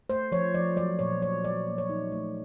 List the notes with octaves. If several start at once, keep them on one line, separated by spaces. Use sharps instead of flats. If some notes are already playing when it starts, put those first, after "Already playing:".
A3 C5
F3 C#5
F3 D5
F#3 D5
A#2 C#5
F#3 C#5
F#3 D5
A#3
C#5
D#4
A3